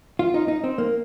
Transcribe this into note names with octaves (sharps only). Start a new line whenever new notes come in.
F4
D#4
D#4
C4
A#3